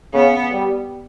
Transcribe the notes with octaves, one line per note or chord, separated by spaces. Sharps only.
C#3 B3
G3